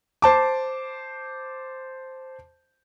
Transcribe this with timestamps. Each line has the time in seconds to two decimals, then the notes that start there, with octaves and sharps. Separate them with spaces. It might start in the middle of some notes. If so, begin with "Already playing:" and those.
0.22 C5 A5 D6